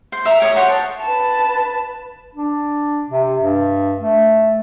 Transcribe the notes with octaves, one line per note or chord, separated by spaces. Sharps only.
C5
E5 A#5
G4 C#5 D#6
F#4 C5 C#5 C#6
A4
B4 A5
D4
C3
G2
A3